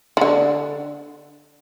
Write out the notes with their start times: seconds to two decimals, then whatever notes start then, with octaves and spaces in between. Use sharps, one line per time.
0.17 D#3
0.21 D3